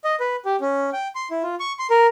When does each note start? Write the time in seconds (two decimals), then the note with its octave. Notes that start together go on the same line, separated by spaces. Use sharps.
0.04 D#5
0.20 B4
0.45 G4
0.61 C#4
0.93 G5
1.15 C6
1.31 E4
1.43 F4
1.60 C#6
1.79 C6
1.90 A#4